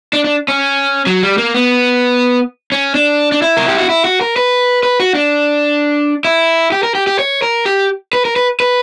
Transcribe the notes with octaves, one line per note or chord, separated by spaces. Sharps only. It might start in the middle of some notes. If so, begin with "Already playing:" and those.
D4
D4
C#4
F#3
G3
A#3
B3
C#4
D4
D4
E4
A#4
G4
F#4
E4
F#4
A#4
B4
B4
F#4
D4
E4
G4
A#4
G4
G4
C#5
A#4
G4
B4
A#4
B4
B4